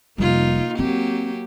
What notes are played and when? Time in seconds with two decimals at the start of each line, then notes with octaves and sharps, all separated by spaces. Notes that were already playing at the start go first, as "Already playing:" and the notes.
0.18 F1 G3 A#3 D#4 F4
0.79 F#3 A#3 C4 G4